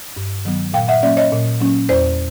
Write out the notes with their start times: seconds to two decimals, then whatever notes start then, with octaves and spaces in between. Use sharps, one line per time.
0.16 G2
0.45 D#3 F#3 B3
0.74 A#2 F5 G5
0.88 E5 F#5
1.03 F#3 A#3 C#4 D5 E5
1.17 C#5 D#5
1.32 A#2
1.60 F#3 A#3 C#4
1.89 E2 C5 D5